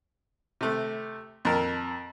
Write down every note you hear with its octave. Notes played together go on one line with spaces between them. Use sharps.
C3 A3
F2 A#4 A5